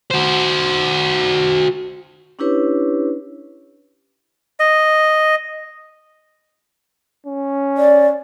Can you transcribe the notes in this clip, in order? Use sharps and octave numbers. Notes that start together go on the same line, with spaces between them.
F#4 C5
C#4 D4 E4 G4 B4 C#5
D#5
C#4
D5